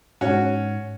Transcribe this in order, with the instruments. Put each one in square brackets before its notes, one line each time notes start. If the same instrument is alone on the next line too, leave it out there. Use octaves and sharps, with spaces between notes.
[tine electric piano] G#2 [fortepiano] C#4 F#4